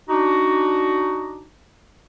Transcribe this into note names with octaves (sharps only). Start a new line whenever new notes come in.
D4 D#4 F#4